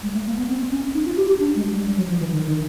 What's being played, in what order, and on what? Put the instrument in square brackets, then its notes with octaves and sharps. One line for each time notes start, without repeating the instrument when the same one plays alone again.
[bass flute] G#3
A3
A#3
B3
C4
C#4
D#4
F4
G4
G4
D4
G#3
G3
G3
F#3
F3
E3
D#3
D#3